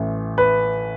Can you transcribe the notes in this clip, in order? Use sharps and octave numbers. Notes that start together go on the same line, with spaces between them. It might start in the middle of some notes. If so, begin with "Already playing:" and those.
Already playing: A1 A2 E3
B4